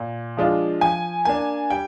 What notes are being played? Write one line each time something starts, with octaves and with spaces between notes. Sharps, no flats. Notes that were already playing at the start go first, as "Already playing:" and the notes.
Already playing: A#2
F3 G#3 D4 F4
F3 G#5
A#3 D4 G#5
G3 G5